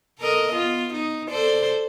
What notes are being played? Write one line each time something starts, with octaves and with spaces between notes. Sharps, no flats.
A4 A#4 D#5
B3 F4
D#4
A4 C5 D5